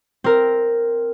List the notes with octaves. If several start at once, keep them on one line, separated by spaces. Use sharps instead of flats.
C4 A#4